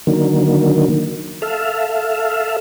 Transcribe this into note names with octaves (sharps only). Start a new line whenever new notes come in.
D3 D#3 F#3 A#3
A4 E5 F5